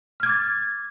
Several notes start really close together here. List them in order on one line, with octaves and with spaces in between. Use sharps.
F6 G#6 D6 A6